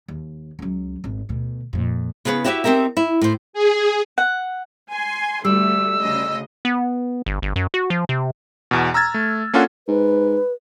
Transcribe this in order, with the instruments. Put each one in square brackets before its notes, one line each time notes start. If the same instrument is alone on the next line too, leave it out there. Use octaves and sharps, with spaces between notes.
[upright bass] D#2
C#2 F#3
G#1
D2 B2
F2 A#2
[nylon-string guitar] C#3 B3 G#4 A#4 B4
E4 F#4 G4 B4 D5 E5
C4 D#4 G4 A#4 E5
E4
A2 C5
[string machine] G#4
[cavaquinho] F#5
[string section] G#5 C6
[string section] D2 A3 [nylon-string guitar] G3 [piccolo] E6
[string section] D2 C#3 D#5
[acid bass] B3
G1
G1
F#2
F#4
F3
C3
[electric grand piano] E2 B2
A#5 E6 F6 G#6 A6
A3
A#3 C#4 D4 F4 A4 F#5
[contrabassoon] G#2 [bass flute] B4